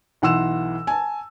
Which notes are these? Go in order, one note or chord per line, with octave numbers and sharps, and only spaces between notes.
B1 E3 F#5 C6 E6 E7
G#5 A5